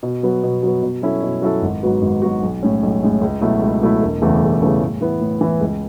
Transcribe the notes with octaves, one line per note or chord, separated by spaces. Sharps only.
B2
F#3 B3
B2
F#3 B3
B2
F#3 C#4 E4 A4
B2
F#3 C#4 E4 A4
G#1
G#2 F#3 B3 F#4
G#1
G#2 F#3 B3 F#4
B1
A2 G#3 C#4
B1
A2 G#3 C#4
C#2
B2 F#3 A3 E4
C#2
B2 F#3 A3 E4
E1
E2 C#3 E3 A3
E1
E2 C#3 E3 A3
A2
E3 B3 E4
A2
E3 B3 E4
C#2